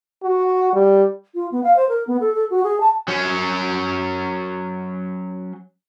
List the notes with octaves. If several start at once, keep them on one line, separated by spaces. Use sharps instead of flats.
F#4
G3
F4
B3
F5
C5
A#4
B3
A4
A4
F#4
G#4
A5
F#3 C#4